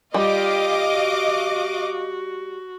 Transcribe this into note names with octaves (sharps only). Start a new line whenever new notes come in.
G3 F4 G4 D#5 F5 D6
F#4